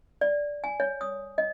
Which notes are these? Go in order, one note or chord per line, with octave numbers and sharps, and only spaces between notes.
D5
G#5
C#5
D#6
D#5